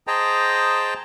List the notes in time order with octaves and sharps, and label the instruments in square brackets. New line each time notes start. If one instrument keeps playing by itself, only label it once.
[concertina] G#4 C5 D#5 G5 A5 A#5